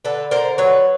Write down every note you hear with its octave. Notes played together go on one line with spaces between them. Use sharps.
D3 A4 B4
D3 A#4 C5
F#3 B4 C#5